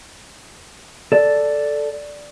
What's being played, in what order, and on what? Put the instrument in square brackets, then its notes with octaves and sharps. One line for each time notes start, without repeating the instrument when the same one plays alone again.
[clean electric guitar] A4 D5